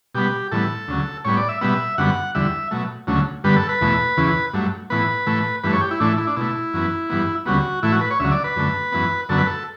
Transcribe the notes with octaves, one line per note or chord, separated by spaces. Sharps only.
B2 G3 B3 G4
A2 E3 G3 B3 A4
D2 C#3 F#3
A2 G3 B3 C#5
D5
E5
B2 G3 B3 E5
F#2 D3 G3 B3 F#5
E2 D3 G3 E5
B2 F#3 A3
D2 C#3 F#3 A3
G2 D3 G3 B3 B4
A4
B4
E2 B2 A3
E2 C#3 E3
G2 F#3 A3
A2 E3 B3 B4
A2 E3 A3
G2 E3 A3 B4
C#5
G4
E4
A2 E3 A3 D4
E4
D4
B2 A3 E4
F#2 E3 B3
G2 E3 B3
D2 C#3 G3 B3 F#4
A2 E3 A3 E4
F#4
B4
C#5
D2 C#3 F#3 E5
D5
B4
F#2 D3 A3
F#2 E3 B3
F#2 D3 F#3 B3 A4
B4
A4